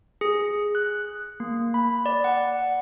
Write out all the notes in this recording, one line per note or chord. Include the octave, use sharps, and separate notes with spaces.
G#4
F#6
A#3
B5
D5
F#5